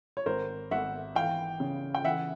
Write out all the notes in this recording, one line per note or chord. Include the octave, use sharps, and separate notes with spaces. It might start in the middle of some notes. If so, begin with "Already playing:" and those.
C#5
G#1 A#4 C5
G#1 E5 F#5
E3 F5 G5
C#3
G5
E3 E5 F#5